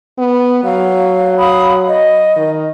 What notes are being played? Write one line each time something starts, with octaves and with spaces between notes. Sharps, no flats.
B3
F#3 F5
F5 B5 D#6
D#5
D#3